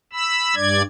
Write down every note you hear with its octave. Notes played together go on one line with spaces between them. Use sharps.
B5 E6
G2 D5 G#6